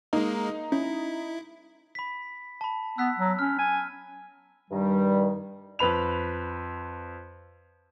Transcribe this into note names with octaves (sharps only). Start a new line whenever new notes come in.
G#3 A#3 D#4
C#4 E4
B5 B6
A5 B5
B3 E6 F#6 B6
F#3
C#4 F6
G#5
G2 D#3 G3
F2 B4 B5 F7